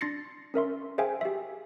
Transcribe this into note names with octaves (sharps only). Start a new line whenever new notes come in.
D4 C6 A6 A#6 C7 C#7
C#4 A#4 E5 C6
G#4 C5 E5 F5 G5 G#5
G4 E5